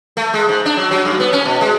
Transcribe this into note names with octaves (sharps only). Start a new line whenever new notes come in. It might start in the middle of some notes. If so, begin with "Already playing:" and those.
A3
G#3
G#2
D4
F#3
F#3
G2
B3
C#4
B2
G#3